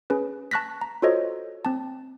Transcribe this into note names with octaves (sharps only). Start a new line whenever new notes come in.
C#4 G#4 B4
A5 C#6 F#6 A#6 B6
A#5
F4 F#4 A4 C5 C#5 D#5
C4 A5